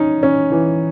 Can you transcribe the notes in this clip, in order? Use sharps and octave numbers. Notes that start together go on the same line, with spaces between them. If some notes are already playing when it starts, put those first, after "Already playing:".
Already playing: C#4 D#4
C#4
E3